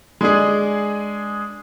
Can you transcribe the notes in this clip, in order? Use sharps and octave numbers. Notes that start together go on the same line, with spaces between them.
G#3 D4 G#4